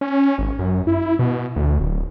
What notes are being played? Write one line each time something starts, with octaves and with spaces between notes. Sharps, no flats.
C#4
G#1
F#2
E4
B2
D2
D1